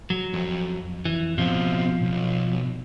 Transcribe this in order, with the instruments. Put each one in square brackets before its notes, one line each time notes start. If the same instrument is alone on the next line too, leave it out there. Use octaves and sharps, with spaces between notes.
[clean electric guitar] F#3
[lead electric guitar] F2
[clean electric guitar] E3
[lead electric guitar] B2 C4 [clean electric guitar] F3
[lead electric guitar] B1